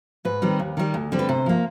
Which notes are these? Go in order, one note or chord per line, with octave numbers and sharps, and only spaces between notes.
G#2 B4
D#3 G3 C4
D#2
D#3 G3
D2
D3 G3 C4
B4
C3 C5
F3 A#3